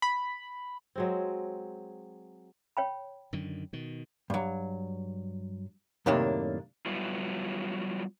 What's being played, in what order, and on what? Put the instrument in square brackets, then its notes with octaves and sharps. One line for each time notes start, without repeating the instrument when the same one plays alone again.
[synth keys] B5
[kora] F#3 G#3 C4
[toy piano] C#5 G5 B5
[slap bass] F#2 D3 D#3
B2 D#3
[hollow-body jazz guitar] G2 F#3
F#2 A2 C3 D#3 A#3 D4
[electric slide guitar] F#3 G3 B3 E4 F4